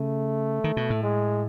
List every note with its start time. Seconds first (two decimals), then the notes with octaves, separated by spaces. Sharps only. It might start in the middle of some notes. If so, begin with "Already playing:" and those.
Already playing: C#3 A3
0.64 D#3
0.77 B2
0.90 A2
1.03 G#3